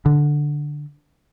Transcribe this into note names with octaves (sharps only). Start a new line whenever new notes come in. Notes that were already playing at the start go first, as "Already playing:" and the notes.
D3